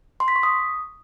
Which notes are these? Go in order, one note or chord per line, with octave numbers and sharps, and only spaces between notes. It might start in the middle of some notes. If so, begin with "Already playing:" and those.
C6
B6
C#6
D#6